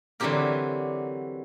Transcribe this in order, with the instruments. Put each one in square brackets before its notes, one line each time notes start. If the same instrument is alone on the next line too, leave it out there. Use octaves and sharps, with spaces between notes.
[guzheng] D3 E3 F#3 C4 G4 A#4